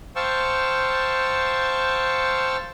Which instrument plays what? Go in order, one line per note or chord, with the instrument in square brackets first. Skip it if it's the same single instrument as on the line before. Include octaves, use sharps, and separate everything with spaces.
[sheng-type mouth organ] C5 F5 G5 A5 C#6 E6